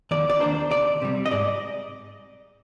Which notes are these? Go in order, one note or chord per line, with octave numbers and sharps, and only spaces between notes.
D#2 D5
D5
D#3 A#3 D4 C5
D2 D5
C3 G3
D#5
G#2 D5